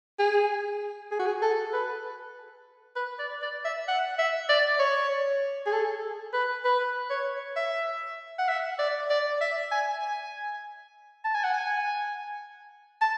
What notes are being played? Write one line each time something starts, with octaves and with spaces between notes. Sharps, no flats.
G#4
G#4
F#4
G#4
A4
B4
B4
D5
D5
E5
F#5
E5
D5
C#5
G#4
A4
B4
B4
C#5
E5
F#5
E5
D5
D5
E5
G#5
G#5
A5
G#5
F#5
G#5
A5